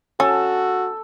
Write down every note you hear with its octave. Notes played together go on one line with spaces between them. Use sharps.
C#4 F#4 A4